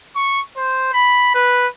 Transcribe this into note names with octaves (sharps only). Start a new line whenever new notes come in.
C#6
C5
B5
B4